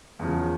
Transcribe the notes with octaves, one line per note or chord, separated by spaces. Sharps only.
E2 C#3 F3